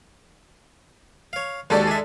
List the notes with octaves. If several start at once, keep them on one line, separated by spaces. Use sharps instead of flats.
C#5 F5
D#2 G#3 F#4 G4 A4 D5
G#4 E5